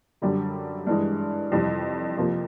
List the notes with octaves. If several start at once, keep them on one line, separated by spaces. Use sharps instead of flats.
F#2 D3 G3
G2 E3 G#3
F2 C3 E3 G3
F2 C3 F3 A#3